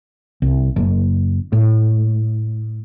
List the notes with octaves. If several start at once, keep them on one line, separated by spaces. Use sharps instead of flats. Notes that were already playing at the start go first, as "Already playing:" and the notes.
C2
F#1
A2